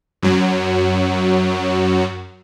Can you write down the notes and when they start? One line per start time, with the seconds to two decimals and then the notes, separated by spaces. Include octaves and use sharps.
0.22 F#2 F#3